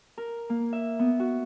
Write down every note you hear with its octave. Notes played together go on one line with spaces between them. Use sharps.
A#4
A#3
E5
B3
F#4